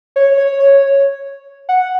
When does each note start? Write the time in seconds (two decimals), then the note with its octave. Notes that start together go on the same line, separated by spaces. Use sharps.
0.16 C#5
0.37 C#5
0.59 C#5
1.69 F#5